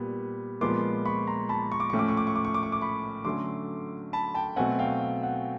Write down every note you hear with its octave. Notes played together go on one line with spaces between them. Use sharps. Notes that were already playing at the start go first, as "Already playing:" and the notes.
Already playing: A#2 G3 B3
A#2 F3 G#3 B3 C6 D6
B5 C#6
A#5 C6
A5 B5
C#6
D6
A2 F3 A3 C#4 C#6
D6
C#6
D6
C#6
D6
C#6
D6
C#6
D6
B5 C#6
D3 F#3 A3 C#4 C6 D6
A5 B5
G5 A5
B2 F#3 A3 C4 F#5 G#5
F5 G5
F5
F#5